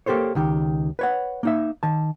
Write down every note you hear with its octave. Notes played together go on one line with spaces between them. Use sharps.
A#3 G4 A4 C5 C#5
C#2 D#3 G4
B4 C#5 F#5
A#3 D#4 E5
D#3 A5